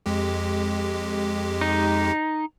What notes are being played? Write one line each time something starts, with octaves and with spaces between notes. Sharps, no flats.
F2 G#3 G4
D#4